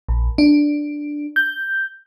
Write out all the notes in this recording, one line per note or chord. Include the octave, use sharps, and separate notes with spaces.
A#1
D4
G6